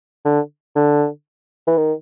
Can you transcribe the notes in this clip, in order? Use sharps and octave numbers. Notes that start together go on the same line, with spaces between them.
D3
D3
E3
D#3